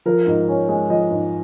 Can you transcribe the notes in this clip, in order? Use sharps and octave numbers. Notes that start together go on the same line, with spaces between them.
F3 A#4
G#2
C#4
G#3
F3 D#5
G#2